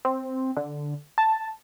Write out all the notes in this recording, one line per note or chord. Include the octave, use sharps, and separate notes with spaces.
C4
D3
A5